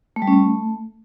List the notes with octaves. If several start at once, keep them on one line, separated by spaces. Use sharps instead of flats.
A3
G3
C#4
A3